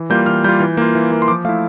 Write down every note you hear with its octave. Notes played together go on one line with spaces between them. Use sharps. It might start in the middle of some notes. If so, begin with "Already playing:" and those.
Already playing: E3
G3 A#3 F4 G6
E3 F6
G3 A#3 F4 G6
E3
A#3 F4
E3
A#3 F4
C6
F3 D6
A3 E4 F5